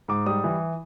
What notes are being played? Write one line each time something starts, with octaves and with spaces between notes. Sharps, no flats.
G#2 D6
G3 D#6
E3